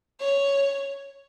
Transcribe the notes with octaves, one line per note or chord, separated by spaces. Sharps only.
C#5